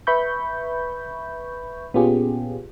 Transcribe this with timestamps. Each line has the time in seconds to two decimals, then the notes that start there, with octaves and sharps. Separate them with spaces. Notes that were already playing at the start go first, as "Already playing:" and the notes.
0.07 B4 E5 B5 C#6 G6
1.94 A#2 B3 C#4 F4 G4 G#4